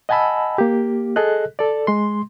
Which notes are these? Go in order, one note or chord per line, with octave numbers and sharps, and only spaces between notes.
D#5 F#5 G#5 A5 B5 E6
A#3 G4
G#4 A4 D#5 F#6
A4 D5
G#3 C6